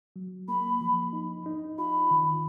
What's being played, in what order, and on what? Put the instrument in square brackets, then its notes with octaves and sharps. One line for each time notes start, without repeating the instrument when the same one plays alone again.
[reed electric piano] F#3
[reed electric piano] A#3 [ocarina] B5
[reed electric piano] F3
D#4
D#4
[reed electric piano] F4 [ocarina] B5
[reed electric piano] D#3